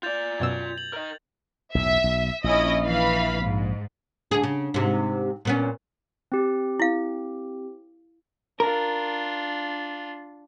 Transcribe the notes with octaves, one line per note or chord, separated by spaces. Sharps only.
F4 D5 G6 A6 F7
F#2 B2 E6 G#6
F#7
A#4 D#5
B1 E2 A2 E5
B1
A#1 C#4 E4 D#5
E3 F5 B5
G#2
D2 G#4
C#3
G#2 C3
A#2 B3 C#4
C4 G4
E4 F5
D4 F4 A#4